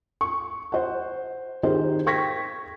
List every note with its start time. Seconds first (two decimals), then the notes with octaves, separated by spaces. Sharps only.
0.21 C#6
0.72 C5 F#5
1.63 D#3 G4 G#4 A#4 C5
2.06 G5 C#6 G#6 A#6 B6